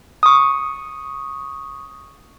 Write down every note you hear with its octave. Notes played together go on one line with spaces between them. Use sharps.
C#6 D#6